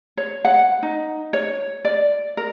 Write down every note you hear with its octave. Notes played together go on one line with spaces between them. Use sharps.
C#5
F#5
D#4
C#5
D5
A#4